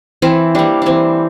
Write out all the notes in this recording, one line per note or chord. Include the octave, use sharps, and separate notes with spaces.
E3 C4 E4
G3 A#3 D4
E3 C4 D4